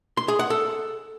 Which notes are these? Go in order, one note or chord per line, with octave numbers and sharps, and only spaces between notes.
C6
G#4
F#5
A4